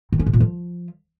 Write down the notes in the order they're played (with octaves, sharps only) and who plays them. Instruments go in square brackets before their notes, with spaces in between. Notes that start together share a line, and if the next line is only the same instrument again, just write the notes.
[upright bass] D#3
C#4
B2
A#2
F3